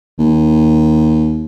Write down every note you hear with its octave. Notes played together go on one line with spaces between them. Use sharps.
D#2